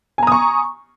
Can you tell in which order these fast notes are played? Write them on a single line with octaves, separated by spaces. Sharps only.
G#5 A#5 D#6 C#6